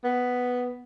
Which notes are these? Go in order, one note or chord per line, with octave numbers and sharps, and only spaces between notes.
B3